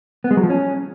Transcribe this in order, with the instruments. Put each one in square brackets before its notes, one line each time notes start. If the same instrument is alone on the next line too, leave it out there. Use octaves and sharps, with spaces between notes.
[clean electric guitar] B3
G#3
F#3
F3
C#4